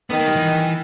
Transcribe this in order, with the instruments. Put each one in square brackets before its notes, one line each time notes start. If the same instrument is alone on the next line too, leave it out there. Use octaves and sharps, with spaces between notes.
[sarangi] D#3 [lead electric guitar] B3
[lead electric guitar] A#3
G3
E3